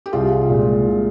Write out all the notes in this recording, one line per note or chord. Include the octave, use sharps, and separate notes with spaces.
G4
C2 F4 G#4
A#2 G#3
C2